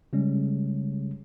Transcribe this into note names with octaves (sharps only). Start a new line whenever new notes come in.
C#3 G3 G#3 C#4